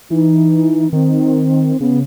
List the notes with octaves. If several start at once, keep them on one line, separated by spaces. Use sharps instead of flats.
E3 D#4
D#3 C4
C#3 B3